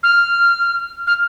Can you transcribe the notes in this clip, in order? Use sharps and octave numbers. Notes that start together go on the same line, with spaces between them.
F6
F6